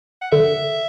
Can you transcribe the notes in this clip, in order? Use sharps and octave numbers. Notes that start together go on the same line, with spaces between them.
F#5
D3 E5